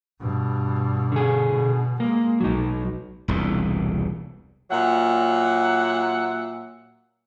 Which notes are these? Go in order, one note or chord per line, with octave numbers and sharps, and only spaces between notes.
G2 B2
D3 G#4
B2
G#3 A#3
B1 F#3 D#4
E1 C2 A#2
A#2 F#3 E5 F#5